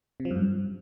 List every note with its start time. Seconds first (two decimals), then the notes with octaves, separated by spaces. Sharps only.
0.20 C3
0.25 F3
0.31 F#2
0.36 G2